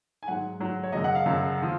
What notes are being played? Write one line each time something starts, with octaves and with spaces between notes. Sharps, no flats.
G#5
G#2 F#3 F#5
G#2 F#3
C#5
F#2 C#3 F#3 D#5
F#5
F5
F#2 C#3 F#3
F3